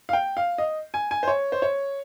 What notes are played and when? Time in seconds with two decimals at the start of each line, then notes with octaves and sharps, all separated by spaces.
0.09 F5
0.13 G5
0.37 F5
0.58 D#5
0.94 G#5
1.11 G#5
1.23 C5
1.28 C#5
1.52 C5
1.62 C#5